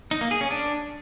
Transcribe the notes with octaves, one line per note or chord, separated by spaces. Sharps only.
D#4
A#3
G#4
C#4
D4